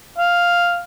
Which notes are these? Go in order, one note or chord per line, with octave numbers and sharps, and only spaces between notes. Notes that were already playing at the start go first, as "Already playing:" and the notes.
F5